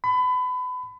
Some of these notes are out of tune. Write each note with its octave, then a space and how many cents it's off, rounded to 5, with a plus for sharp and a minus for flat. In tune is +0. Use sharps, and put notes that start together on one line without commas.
B5 +30